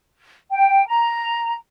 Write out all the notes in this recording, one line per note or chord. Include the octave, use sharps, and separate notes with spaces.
G5
A#5